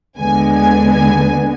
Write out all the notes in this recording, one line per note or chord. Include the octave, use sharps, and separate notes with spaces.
D#2 D3 G#3 B3 G#5
G#5
G#5